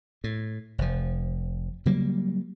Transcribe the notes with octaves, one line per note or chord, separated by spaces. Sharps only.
A2
F1 F3
C#3 F#3 G3 A#3